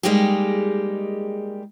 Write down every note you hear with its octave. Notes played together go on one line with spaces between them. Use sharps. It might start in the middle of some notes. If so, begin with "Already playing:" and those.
G3 G#3 A#3 D#4 G4 G#4